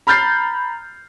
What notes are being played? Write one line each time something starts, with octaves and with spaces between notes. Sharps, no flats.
A#5 B5 F6 G6 A6 C7